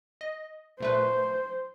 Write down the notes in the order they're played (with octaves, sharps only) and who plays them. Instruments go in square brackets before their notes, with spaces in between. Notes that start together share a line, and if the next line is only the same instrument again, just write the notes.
[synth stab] D#5
[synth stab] A#2 A3 B4 [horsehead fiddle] C5